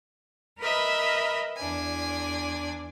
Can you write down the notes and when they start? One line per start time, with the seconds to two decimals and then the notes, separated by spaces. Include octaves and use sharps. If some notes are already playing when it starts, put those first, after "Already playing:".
0.59 A#4 B4 D#5 E5 B5
1.57 E2 D4 G#5